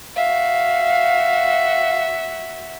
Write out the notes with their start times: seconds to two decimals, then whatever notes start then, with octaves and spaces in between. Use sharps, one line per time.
0.16 F#4 E5 F5